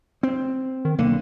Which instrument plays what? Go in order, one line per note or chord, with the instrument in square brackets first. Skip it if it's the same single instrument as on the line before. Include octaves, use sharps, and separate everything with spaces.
[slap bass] C4
[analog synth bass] D#3
[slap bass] B1 D3 [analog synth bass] A#3